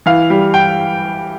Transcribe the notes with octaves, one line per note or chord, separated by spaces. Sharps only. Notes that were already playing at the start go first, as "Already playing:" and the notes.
E3 F5
G3
G5